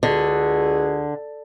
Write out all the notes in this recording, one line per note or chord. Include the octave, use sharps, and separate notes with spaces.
C#2 D3 F#4 G#4